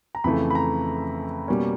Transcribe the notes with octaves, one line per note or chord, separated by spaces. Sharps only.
A#5
F2 C#3 E3 A3 B5
B5
A#5
B2 G3 A#3 C#4